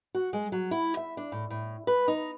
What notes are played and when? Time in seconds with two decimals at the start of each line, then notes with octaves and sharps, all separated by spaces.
0.15 F#4
0.33 G#3
0.52 F#3
0.71 E4
0.97 E5
1.17 D4
1.32 A2
1.50 A2
1.87 B4
2.08 D#4